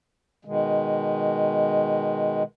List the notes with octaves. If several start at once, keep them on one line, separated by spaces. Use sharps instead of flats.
B2 D#3 G#3